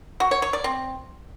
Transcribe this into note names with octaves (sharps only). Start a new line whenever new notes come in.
F#4
C#5
C#5
D5
C4